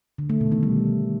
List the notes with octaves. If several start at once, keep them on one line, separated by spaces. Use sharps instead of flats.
D3
A3
B2
D#3
G3